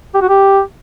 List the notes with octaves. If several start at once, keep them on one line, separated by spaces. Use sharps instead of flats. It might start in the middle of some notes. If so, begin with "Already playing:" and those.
G4
F#4
G4